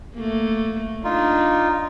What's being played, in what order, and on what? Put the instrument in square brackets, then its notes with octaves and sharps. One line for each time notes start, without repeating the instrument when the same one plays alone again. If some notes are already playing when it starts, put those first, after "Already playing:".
[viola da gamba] A3 A#3
[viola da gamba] D4 [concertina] D#4 F4